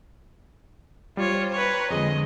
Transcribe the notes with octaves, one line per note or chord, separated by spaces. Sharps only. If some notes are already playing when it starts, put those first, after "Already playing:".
G3 F4 C5 C#5
B4 C#5 A#5 C6 A#6
F2 D3 G#3 G#4 D#5